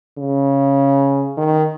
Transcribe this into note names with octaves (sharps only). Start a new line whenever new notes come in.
C#3
D#3